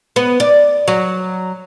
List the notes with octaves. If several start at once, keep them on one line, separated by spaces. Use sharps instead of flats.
B3
D5
F#3